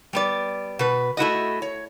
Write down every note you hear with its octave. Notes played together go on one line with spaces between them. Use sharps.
G3 B3 D5
B2 B4
A3 E4 F#4 D#5
C#5